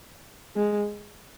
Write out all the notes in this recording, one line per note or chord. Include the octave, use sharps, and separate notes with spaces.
G#3